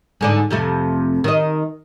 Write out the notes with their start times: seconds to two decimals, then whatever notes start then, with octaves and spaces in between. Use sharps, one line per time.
0.21 G#2 D3 D4
0.51 F2 C3 A3
1.24 D#3 D#5